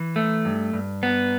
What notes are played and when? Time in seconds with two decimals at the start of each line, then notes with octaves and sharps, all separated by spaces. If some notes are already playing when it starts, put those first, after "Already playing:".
Already playing: E3
0.16 A3
0.45 G2
0.73 G2
1.03 B3